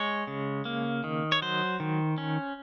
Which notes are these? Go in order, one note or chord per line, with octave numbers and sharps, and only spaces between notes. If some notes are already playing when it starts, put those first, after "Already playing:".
Already playing: G#3 C#5
C#3
A#3
D#3
C#5
F#3 C5
D#3
C#4